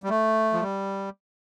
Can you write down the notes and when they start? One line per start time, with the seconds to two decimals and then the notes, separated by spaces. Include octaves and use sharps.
0.03 G3
0.09 A3
0.53 F3
0.61 G3